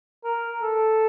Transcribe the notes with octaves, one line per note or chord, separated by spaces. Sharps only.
A#4
A4